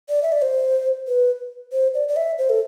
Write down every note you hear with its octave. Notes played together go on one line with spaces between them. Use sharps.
D5
E5
D5
C5
B4
C5
D5
D5
E5
C5
A4